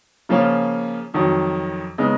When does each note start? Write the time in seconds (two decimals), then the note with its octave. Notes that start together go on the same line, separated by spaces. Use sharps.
0.29 C#3 F3 A#3 C#4 F4
1.14 F2 D#3 F#3
1.98 C#3 G#3 B3 D#4